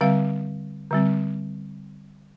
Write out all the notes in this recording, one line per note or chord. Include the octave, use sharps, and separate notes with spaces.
D3 G3 C4 F5
D3 G3 C4